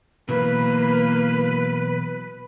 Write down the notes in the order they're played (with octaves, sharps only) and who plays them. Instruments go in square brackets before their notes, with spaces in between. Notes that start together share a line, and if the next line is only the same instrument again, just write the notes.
[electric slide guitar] B2 E3 F#3 [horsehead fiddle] A#3 [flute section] B4